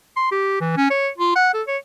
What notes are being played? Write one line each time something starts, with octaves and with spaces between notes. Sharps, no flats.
C6
G4
E3
C#4
C#5
F4
F#5
A4
C#5